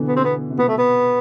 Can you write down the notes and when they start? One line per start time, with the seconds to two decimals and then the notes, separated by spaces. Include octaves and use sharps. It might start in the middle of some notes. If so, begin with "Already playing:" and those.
Already playing: B2 D3 E3
0.08 B3
0.16 C4
0.24 B3
0.51 C3
0.58 B2 B3
0.68 A3
0.78 B3